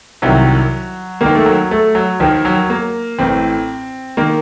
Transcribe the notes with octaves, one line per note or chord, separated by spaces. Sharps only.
C2 C3 D#3 F#3
D#2 D#3 A#3
A3
F#3
A3
F#3
D#2 D#3 F3
F#3
A#3
A1 A2 C4
D#3 A#3